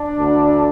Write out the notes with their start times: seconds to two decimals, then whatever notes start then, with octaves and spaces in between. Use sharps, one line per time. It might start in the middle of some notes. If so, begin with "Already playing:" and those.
Already playing: D4
0.19 D2 D3